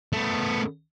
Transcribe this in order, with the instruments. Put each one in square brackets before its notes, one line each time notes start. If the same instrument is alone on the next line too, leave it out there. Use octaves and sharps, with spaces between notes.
[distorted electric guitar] A3 B3